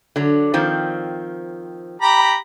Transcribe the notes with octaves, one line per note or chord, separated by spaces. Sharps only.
D3 F#3
D#3 F3 C4
G4 A#5 B5